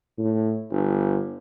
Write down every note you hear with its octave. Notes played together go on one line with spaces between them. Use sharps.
A2
G1